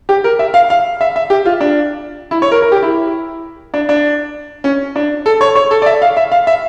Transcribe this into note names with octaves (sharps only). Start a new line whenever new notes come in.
G4
A#4
E5
F5
F5
E5
E5
G4
F4
D4
E4
C#5
A#4
A#4
G4
E4
D4
D4
C#4
D4
A4
C#5
C#5
A4
D5
E5
F5
E5
F5
E5